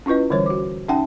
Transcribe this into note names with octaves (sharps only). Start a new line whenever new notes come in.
C#4 E4 F4 B4 D#5
D3 E3 G3 C5 C#5
F#4 D6
C#4 D#4 E5 F#5 G5 A5